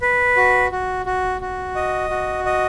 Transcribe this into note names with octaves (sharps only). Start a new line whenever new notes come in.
B4
F#4
F#4
F#4
F#4
D#5
F#4
D#5